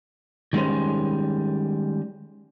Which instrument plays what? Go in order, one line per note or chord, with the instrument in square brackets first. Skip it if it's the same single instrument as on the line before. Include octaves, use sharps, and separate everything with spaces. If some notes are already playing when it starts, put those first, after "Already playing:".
[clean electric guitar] D#3 G3 G#3 C#4 C5